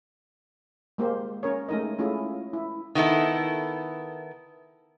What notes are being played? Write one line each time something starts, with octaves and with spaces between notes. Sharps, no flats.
G#3 A#3 G4 C5
C#4 A#4 C#5
G#3 A3 D#4 A#4 D#5
A3 C#4 E4 F4 G#4
E4
D#3 B3 E4 A4